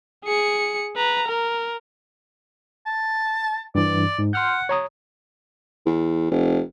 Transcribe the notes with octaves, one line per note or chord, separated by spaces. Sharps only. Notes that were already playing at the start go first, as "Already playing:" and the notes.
G#4 C#7
B4 A#5
A#4
A5
G2 E3 D5
G#2
F#5 C6 F6 G6
C#5 A#5 D#6
E2
F1